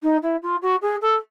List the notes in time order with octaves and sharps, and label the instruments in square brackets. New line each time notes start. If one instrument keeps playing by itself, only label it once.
[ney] D#4
E4
F4
F#4
G#4
A4